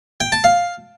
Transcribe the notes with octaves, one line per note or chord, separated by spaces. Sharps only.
G5
A5
F5